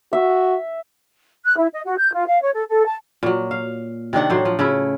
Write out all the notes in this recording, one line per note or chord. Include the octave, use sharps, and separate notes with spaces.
F#4 E5
F#6
E4
D#5
F#4
G6
F4
F5
C#5
A4
A4
A5
A#2 F#3
F5
C3 D#3 D4 F#5
A2 F#3 C5
F3
C#3 A3 E4